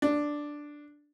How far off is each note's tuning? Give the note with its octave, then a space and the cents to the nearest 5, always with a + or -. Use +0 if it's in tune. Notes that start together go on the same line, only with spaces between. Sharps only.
D4 +0